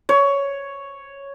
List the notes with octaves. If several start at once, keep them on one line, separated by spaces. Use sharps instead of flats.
C#5